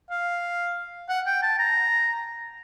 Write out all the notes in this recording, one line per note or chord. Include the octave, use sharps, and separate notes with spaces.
F5
F#5
G5
A5
A#5